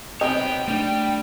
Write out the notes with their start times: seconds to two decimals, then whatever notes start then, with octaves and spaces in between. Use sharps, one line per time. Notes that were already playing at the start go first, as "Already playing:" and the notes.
0.21 B3 C4 C#5 D#5 G5
0.68 G3 A3 D4